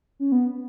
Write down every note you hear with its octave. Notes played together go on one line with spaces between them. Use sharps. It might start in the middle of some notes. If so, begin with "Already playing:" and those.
C#4
B3